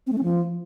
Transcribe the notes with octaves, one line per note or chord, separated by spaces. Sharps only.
C4
A3
C#4
F3